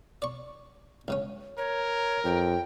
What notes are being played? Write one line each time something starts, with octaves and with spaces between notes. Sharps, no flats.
D5 C#6
C#2 C#3 C#4
A#4 C#5
F2 G5